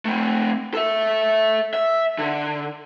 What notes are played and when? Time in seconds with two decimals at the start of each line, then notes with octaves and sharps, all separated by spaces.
0.05 A3 C4
0.74 A4 E5
1.74 E5
2.18 D3